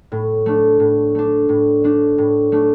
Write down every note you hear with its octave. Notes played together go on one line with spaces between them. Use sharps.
A2
A3 D4
A2
A3 D4
A2
A3 D4
A2
A3 D4